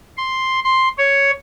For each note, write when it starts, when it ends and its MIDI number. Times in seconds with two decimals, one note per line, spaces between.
0.18 0.60 84
0.64 0.88 84
0.98 1.31 73